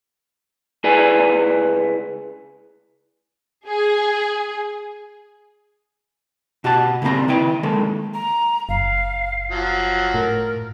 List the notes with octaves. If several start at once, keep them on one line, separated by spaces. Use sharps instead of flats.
C#2 E4 G#4 B4 D5 G#5
G#4
B2 F#4 G4 A5
C#3 G3 A#3 C4 A#5
D#3 E4 B4 G5
D#3 G#3 A#3 A4
A#5
F#1 F5
F3 F#3
A2 A#4